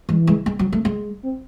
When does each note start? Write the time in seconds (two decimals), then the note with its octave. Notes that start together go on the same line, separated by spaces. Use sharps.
0.09 E3 G#3
0.27 G#3
0.46 G#3
0.59 F#3
0.73 A3
0.85 G#3
1.23 C4